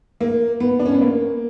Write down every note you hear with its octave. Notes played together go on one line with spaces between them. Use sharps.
A#3
B3
D4
C#4
B3
A#3